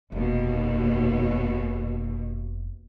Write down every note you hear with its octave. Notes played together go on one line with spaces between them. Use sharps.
F1 D#2 B2